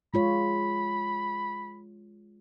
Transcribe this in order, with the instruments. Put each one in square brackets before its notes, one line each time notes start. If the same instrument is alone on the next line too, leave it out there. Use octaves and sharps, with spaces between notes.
[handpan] G#3 F4 C#5 [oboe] B5